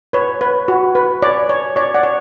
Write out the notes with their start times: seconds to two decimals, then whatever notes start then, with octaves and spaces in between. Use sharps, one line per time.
0.13 B4 C#5
0.41 B4
0.68 F#4
0.95 B4
1.22 C#5 D5
1.49 C#5
1.76 C#5 D5
1.94 D5 F#5
2.03 C#5